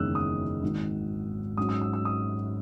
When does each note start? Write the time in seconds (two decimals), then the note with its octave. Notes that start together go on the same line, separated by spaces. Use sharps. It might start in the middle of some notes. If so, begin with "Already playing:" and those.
Already playing: F#1 E2 D#3 G#3 C#4 E6 F#6
0.15 D#6
0.63 G#1 G#2 D#3
1.57 G#2 F#3 C#4 D#6
1.69 E6
1.82 E6
1.93 E6
2.05 D#6